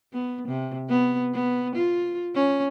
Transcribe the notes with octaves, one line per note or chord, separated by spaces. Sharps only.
B3
C3
B3
B3
F4
C#4